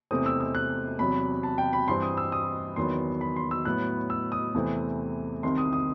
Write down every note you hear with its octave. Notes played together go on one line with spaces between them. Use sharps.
E2 C3 E3 A3 C4 D#6
E6
E6
F#6
E2 C3 F#3 B5
A5
G5
B5
G2 E3 G3 C4 C6
D#6
E6
D#6
E2 D#3 F#3 B3 C6
B5
C6
E6
A2 F#3 B3 F#6
E6
D#6
E2 C3 E3 A3 C4
C2 C3 D#3 C6
D#6
D#6